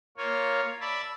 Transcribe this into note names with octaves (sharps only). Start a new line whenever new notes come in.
A#3 F4 C#5
D5 E5 A5 B5